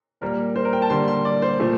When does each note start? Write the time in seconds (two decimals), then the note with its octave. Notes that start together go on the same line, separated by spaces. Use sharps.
0.21 A#2 G3 A#3 A#4
0.56 C5
0.65 A#4
0.73 G5
0.82 A5
0.90 D3 G3 A#3 C6
1.08 C6
1.25 D5
1.42 C5
1.59 A#2 F3 A3